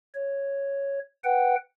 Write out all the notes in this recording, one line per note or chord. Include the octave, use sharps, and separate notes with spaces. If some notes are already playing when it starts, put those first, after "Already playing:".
C#5
B4 F#5 G5